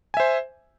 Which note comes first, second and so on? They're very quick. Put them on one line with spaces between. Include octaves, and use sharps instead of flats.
G#5 E5 C5